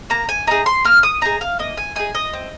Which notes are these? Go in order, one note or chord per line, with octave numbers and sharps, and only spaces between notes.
A#3 A#5
G#5
D#4 G#4 A#5
C6
A#3 F6
D#6
D#4 G#4 A#5
F5
A#3 D#5
G#5
D#4 G#4 G#5
D#5
C4